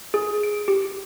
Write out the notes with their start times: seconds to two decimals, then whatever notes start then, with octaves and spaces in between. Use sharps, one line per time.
0.14 G#4
0.43 D7
0.68 G4